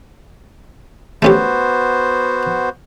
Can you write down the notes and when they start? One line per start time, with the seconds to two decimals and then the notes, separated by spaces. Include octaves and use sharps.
1.22 A3 B3 C#4 F#4 G4 C5